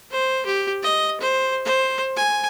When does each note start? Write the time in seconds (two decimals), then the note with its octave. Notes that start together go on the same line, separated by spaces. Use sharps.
0.11 C5
0.46 G4
0.83 D#5
1.20 C5
1.65 C5
2.16 G#5